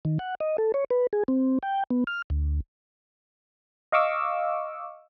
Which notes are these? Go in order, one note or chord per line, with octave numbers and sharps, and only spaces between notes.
D#3
F#5
D#5
A4
C#5
B4
G#4
C4
G5
B3
F6
D2
D#5 F5 C#6 D6 E6